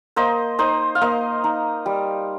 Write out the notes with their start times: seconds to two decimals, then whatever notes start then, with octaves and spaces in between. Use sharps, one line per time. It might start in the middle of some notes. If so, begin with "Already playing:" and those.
0.16 A#3 C5 D#5
0.59 D#4 C5 D#5
0.95 F5
1.01 A#3 C5 D#5
1.44 D#4
1.86 G3